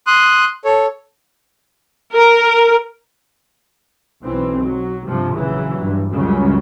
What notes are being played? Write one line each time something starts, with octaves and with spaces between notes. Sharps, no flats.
C6 D#6 F#6
A4 C#5
A#4
B1 E3 C4
F#3
G2 C3 F3
A#1 C#3 E3 F#3
G2
C#2 F#2 C#3 F#3 G3 C#4